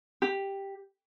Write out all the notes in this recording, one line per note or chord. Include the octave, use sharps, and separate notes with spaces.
G4